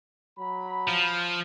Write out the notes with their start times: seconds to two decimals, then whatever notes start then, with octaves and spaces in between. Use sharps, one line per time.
0.39 F#3 B5
0.87 F3